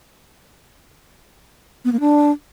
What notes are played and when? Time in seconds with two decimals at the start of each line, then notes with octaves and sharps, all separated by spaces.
1.85 B3
1.92 A#3
2.00 D4